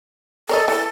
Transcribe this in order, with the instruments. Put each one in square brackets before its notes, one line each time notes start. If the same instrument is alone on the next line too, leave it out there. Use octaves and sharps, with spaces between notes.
[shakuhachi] A4 [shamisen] A#4 C#5 D#5
[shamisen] E3 [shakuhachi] A4